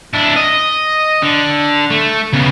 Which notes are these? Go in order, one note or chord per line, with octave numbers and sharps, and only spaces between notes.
D4 E4
D#5
D3
A3
C#3 B3